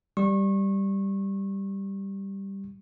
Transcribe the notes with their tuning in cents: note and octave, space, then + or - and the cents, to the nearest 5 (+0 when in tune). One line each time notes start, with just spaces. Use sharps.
G3 +0 C#6 -30